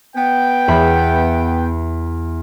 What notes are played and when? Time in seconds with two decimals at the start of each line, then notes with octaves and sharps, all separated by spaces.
0.16 B3 G5
0.68 E2 E5 B5